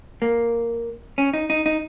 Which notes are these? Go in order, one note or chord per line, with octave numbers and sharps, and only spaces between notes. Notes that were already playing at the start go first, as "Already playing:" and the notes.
A#3
C#4
D#4
D#4
D#4